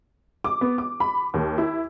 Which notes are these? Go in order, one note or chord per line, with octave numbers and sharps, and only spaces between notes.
D6
B3
D6
B5
D#2
E4